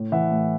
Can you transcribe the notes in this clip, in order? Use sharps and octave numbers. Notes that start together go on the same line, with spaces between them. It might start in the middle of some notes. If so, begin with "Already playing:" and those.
Already playing: A2
E3 E5 F#5
A2